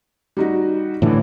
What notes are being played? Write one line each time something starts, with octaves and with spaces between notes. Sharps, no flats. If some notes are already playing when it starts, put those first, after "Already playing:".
G3 D#4 F#4
A2 D3 E3